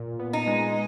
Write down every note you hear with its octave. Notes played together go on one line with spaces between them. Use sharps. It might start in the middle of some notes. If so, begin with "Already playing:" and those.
Already playing: A#2
B3
D#4
G#3